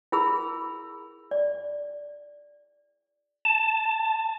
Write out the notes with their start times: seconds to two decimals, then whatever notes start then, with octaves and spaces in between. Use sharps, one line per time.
0.12 E4 G#4 A#4 B5 E6
1.31 D5
3.45 A5